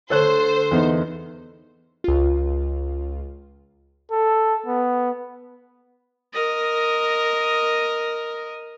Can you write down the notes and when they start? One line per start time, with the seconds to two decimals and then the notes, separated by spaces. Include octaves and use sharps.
0.10 D3 A3 A4 C5 C#5 F#6
0.71 E2 B3 D#4
2.04 C#2 F4
4.11 A4
4.66 B3
6.33 A#4 D#5